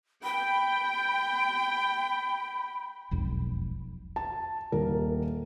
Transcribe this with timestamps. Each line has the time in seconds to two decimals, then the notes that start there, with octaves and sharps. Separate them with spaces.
0.24 G5 B5
3.11 E1 B1 F2
4.16 A5
4.72 D#1 A#4